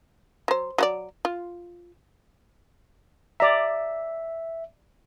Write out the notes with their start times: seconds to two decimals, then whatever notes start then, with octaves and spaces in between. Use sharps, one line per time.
0.48 F#3 C5
0.78 F#3 F#4 D5
1.25 F4
3.40 D5 E5 A#5